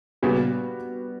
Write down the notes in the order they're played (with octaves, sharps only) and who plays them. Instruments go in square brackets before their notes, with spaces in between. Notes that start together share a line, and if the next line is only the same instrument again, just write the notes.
[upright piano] A#2 C#3 [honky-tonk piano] G3 B3 F#4